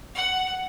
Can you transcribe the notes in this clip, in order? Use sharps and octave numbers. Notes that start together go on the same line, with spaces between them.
F#5